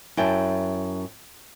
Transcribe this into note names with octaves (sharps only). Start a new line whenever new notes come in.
F#2 E4 G5 A5